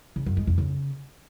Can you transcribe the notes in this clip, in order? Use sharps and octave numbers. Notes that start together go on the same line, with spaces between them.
C#3
F#2
G#3
F2
C#3